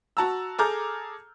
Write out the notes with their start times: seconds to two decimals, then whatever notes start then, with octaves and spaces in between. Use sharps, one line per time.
0.17 F#4 A5 A#5 E6
0.59 G#4 A4 A#5 D6 F6 G6